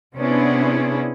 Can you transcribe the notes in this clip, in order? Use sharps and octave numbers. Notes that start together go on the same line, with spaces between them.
C3 B3 C#4 D4 E4 G#4